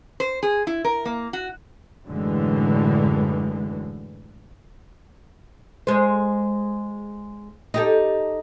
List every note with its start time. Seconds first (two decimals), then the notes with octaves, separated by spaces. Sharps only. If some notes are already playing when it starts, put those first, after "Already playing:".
0.20 C5
0.43 G#4
0.67 E4
0.85 A#4
1.05 A#3
1.33 F#4
2.07 F#2 A2 D3 E3 G#3
5.87 G#3 C5
7.74 D#4 G4 A4